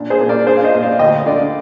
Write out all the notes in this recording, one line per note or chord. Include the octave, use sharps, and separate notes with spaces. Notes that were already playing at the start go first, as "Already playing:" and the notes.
Already playing: A#2 D4
G#4 C5
A#2
A#4 D5
D4 G#4 C5
F5
C5 D#5
A#2
D5 F5
D2 D#5 G5
D3 D5 F5